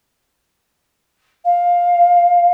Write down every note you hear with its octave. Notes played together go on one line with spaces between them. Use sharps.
F5